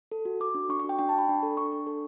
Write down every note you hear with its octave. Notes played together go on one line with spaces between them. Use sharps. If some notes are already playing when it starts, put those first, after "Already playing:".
A4
F#4
F#4 D6
D4
D4 C#6
C#6
F#4 G5
D4 G5
A5
D4
B5
D4
A4
D4 C#6
D4
A4